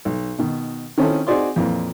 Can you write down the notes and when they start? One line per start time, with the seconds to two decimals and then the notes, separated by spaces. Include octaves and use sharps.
0.05 B1
0.38 B2 D#3
0.98 D#3 C4 C#4 E4 A4
1.27 C4 D#4 F#4 G#4 D5 C6
1.56 F2 A#2 E3